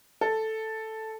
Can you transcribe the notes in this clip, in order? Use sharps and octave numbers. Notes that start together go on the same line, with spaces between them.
A4